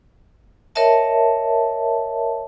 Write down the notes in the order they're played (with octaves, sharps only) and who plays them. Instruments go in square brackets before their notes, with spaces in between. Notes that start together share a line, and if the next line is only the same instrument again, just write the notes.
[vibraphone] A#4 C#5 D#5 E5 A5